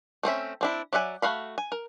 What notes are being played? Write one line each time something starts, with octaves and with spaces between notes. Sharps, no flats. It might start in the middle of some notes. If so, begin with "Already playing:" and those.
A3 C4 C#4 E5
C4 D4 E4
F#3 D5 E5 F#5 G#5
A3 F#4 F5 B5
G#5
A#4